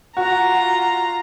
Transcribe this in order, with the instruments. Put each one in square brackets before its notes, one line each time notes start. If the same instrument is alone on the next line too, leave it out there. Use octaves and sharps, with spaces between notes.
[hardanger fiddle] F4 A#5 [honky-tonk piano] F#4